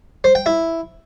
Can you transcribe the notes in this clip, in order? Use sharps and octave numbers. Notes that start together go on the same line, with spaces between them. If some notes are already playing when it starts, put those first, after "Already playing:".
C5
G5
E4